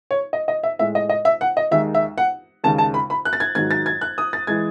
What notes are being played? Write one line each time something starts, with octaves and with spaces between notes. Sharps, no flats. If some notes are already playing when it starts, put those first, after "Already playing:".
C#5
D#5
D#5
E5
A2 G#3 E5
D#5
D#5
E5
F#5
D#5
D#2 D#3 G#3 E5
E5
F#5
D#2 C#3 G#3 A5
A5
B5
B5
F#6
A6
G#6
G#2 D#3 F#3 G#6
A6
G#6
F#6
D#6
A6
E3 G#3 G#6